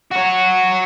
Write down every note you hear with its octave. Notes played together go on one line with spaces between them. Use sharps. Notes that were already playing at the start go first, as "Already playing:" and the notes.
F#4 C#5